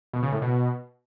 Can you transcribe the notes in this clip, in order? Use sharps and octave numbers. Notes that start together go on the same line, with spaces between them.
B2
C#3
A2
B2